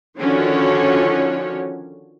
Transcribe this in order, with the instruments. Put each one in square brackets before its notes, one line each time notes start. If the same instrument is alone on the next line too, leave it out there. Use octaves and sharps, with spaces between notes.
[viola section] D3 D#3 F3 C#4 F#4 C#5